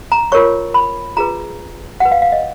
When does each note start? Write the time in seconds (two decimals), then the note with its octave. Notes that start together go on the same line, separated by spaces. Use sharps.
0.12 A#5
0.32 F4 A#4 C#5 C#6
0.74 B5
1.17 F4 G#4 B4 A#5
2.00 F#4 B4 F#5
2.12 F5
2.22 F5
2.32 D#5